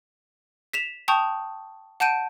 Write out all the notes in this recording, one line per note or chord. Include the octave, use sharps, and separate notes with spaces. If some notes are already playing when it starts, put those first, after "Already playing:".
B6 E7 F7
G5 A5 C#6 D#6 G6 F7
F#5 A5 G6 D7 D#7